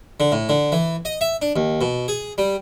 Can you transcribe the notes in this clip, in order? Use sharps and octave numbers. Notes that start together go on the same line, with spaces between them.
D3
A2
D3
E3
D#5
E5
D4
D#2
B2
G#4
G3